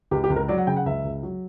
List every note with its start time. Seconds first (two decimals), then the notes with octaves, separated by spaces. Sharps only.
0.11 C#2 G4
0.24 G4
0.30 C#2
0.36 A#4
0.48 F#3 D5
0.58 F#5
0.67 C#3 G5
0.76 F#5
0.86 C#2 E5
1.05 C#2
1.23 F#3